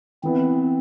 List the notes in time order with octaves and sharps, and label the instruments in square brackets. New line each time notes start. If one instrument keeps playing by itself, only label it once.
[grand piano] E3 B3 E4 [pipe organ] C4